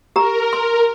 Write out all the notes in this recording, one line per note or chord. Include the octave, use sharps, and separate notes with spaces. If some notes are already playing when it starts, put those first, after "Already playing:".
G4 A#4 A#5
C6